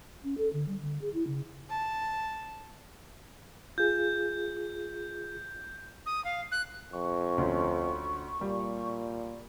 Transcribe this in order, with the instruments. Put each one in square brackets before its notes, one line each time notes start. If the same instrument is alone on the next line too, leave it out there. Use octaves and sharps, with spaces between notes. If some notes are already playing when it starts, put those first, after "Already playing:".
[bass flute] C#4
A4
D3
G3
D3
G#4
E4
C#3
[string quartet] A5
[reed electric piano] F4 G#4 [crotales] G6
[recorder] D#6
F5
F#6
[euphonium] F2 [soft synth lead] C#6
[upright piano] D2 C#4
[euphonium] A#2 [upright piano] G3